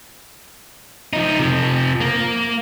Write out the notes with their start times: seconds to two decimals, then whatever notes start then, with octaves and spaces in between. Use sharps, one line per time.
1.13 F3 D#4
1.39 C3 F3
2.00 A#3